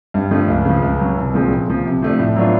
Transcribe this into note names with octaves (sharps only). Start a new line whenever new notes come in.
G2
D3 F3 A3
C#2
C#3 F3
C#2
C#3 F#3
C2
A#2 F3 G#3 C4
C#3
F3 A#3
C3
F3 A3 D4
A2
F#3 B3 D4 F4